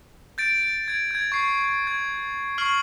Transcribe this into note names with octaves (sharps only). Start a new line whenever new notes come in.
G6 A6 D7
G#6 D7
G6 G#6
C#6 C7
G#6
C#6 F6 C7 F#7 G7